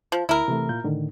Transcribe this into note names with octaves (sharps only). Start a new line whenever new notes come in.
F3
D2 E4 A#4
C3 E3 A3
A#2 F4 G6
A2 D3 D#3